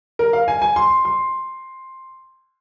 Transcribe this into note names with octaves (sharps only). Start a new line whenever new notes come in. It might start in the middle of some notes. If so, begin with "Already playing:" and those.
A#4
F5
G#5
G#5
C6
C6